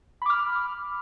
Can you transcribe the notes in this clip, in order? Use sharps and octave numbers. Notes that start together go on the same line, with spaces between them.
B5 D6 F6